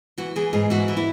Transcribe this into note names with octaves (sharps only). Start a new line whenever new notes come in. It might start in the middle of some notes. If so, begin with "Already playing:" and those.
E3 F#4
E3 G#4
G#2 G#4
E3 F#4
E3
E4